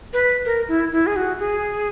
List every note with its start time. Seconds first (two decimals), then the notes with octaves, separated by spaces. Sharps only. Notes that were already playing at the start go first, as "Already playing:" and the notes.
0.13 B4
0.45 A#4
0.68 E4
0.92 E4
1.07 G#4
1.16 F#4
1.39 G#4